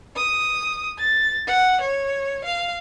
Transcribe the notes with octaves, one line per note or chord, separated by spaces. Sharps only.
D#6
A6
F#5
C#5
F5